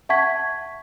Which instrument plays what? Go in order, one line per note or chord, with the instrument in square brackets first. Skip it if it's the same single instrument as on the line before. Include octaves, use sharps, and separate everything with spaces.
[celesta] E5 F#5 A5 C#6 G#6 B6